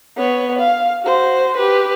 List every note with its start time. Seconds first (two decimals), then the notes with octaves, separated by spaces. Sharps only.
0.17 B3 C#5
0.59 F5
1.02 F#4 C5
1.57 G4 B4